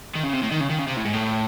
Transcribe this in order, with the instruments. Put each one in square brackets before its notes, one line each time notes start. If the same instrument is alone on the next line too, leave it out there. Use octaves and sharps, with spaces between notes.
[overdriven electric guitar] D#3
C#3
C3
A2
D#3
C#3
D#3
C#3
C3
A2
G#2
A2